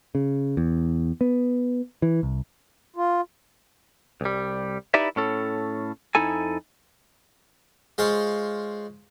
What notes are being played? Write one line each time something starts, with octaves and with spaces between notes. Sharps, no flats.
C#3
E2
B3
E3
C2
F4
C2 G3
D#4 E4 G4 B4 D5 E5
A2 C#4 A4
F2 D#4 E4 A4 G#5
G#3 F4 C5 C#5